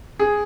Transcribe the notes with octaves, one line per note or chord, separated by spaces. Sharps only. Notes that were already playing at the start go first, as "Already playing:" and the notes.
G#4